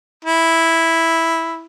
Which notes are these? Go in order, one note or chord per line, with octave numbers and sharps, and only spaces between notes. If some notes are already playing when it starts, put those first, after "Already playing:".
E4